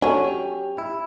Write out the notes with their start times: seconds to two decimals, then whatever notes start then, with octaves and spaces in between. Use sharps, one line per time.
0.02 F#3 C#4 D4 A4 G#5
0.24 G4
0.78 E4